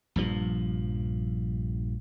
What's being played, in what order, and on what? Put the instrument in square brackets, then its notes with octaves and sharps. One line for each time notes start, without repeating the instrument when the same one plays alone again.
[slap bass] A#1 G2 F3